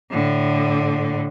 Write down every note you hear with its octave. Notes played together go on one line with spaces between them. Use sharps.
A2 D3